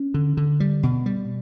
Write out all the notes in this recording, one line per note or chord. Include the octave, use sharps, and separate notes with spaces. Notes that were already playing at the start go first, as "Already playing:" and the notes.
Already playing: C#4
D3
D3
G3
B2
G3